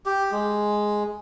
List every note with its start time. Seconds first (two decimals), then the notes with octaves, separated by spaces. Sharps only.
0.06 G4
0.31 G#3